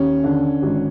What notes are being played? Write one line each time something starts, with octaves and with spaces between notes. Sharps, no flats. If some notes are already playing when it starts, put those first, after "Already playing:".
Already playing: D#2 C#4
D3
G#1